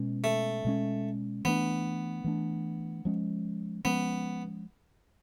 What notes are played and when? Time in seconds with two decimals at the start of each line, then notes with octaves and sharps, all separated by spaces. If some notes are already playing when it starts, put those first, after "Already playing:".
Already playing: B2 G#3 C#4
0.24 A3
0.65 B2 G#3 C#4
1.45 E3 A3 B3 D4
2.24 E3 A3 D4
3.05 F3 G#3 C#4
3.84 F3 G#3 B3 C#4